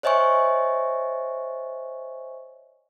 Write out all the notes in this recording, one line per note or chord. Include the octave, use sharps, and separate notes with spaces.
C5 C#5 D#5 E5 G#5 C#6